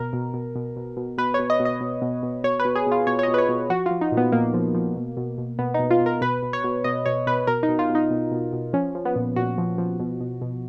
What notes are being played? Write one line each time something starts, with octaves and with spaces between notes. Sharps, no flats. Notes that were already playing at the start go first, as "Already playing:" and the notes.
Already playing: B2 A#4
B2
B2
B2
B2
B2
B2 B4
B2 C#5
D#5
B2
D#5
B2
B2
B2
B2 C#5
B4
B2
G#4
B2
F4
B2 C#5
C#5
B2 D#5
B4
C#5
B2
F3 F#4
F3 F4
D#4
A#2
B3
A#2 A#3
F3
F3
B2
B2
B2
B2 B3
D#4
B2
F4
B2
A#4
B2 B4
B2
C#5
B2
B2 D#5
B2 C#5
B2 B4
B2 A#4
D#4
B2
F4
B2
D#4
B2
B2
B2
F3 C#4
F3
B3
A#2
A#2 F#4
F3
F3
B2
B2
B2